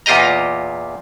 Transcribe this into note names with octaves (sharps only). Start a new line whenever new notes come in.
E2 A#2 F4 G4 D#5 A#5